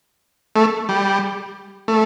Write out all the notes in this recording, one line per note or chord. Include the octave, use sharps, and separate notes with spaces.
A3
G3
A3